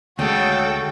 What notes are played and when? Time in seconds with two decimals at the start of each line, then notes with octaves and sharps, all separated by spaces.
0.19 D2 C#3 G#3 F#4 A4 G5